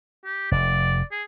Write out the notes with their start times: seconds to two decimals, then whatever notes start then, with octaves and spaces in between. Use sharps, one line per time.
0.25 G4
0.51 F1 D5
1.11 G#4